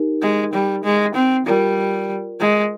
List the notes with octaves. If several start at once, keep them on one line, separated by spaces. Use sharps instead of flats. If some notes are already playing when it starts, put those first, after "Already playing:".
Already playing: D#4 G4 A#4
G#3
G3
G#3
C4
G3 F4 A#4 D5
G#3